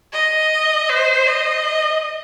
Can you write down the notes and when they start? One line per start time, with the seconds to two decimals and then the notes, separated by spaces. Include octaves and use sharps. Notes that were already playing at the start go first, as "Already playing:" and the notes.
0.13 D#5
0.90 C5
1.27 D#5